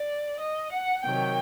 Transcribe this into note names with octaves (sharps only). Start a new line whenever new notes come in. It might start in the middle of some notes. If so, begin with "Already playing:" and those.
Already playing: D5
D#5
F#5
C3 D#3 F#3 G5